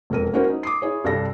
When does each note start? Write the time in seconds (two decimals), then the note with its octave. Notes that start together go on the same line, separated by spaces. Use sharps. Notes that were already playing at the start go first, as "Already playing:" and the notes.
0.10 E1 F2 A#4 D#7
0.33 A#3 C#4 E4 F#4 A#4 C5
0.50 D#4
0.63 D6 D#6 C7
0.82 E4 G#4 C#5
1.04 C2 G2 G4 A4 A#6